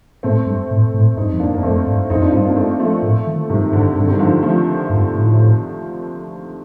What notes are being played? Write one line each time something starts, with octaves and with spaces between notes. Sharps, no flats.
A2 A3 C4
G2
A2
A2
G2 C4 D#4
F2
A#3 D4
F2
A#3
F2 A3 C4
G2
F2 C4 D#4
D4 F4
G2 C4 D#4
A#3 D4
A3 C4
F3 A3
A2
D#3
G2 C3 D#3
G2 D3
G2 D3
C3 D#3
D3 F3
F3 A3
G2
A2